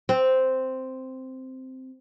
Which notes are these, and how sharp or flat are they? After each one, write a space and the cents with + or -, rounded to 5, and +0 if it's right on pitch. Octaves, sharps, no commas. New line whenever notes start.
C4 -5